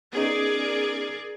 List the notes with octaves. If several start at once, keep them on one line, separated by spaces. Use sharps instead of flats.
B3 C#4 D#4 G#4 A#4 D5